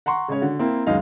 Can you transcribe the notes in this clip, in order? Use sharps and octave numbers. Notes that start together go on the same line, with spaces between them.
F#5 A#5 C6 C#6
C#3 G#3 C#4 C#5
D3 F#4
A#3 C4 E4 A#4
C#2 F#2 D#3 D#5 F5